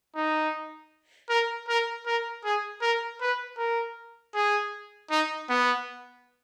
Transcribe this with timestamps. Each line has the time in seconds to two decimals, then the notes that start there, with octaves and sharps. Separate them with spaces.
0.15 D#4
1.29 A#4
1.68 A#4
2.06 A#4
2.44 G#4
2.82 A#4
3.21 B4
3.58 A#4
4.35 G#4
5.10 D#4
5.49 B3